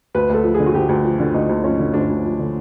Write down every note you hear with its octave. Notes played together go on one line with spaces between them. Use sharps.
D2 B4
D2 A4
F3
G#4
D3
F#4
D2 G4
D2
F3
D3
D2 D#4
D2
F3 C#4
D3
D2 D4
D2
F3
D3